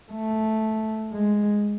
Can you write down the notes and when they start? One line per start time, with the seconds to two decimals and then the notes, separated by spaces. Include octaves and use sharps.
0.13 A3
1.13 G#3